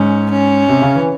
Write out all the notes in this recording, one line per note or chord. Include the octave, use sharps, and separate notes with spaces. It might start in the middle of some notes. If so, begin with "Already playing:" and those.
Already playing: G#2 C#4
C#4
C3
C#3
E3